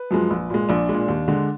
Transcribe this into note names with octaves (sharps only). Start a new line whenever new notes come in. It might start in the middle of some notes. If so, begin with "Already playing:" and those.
Already playing: B4
F#2 F3 G#3
A#1
A#2 G#3
A#1 D4
A#2 G#3
D#2
D3 G#3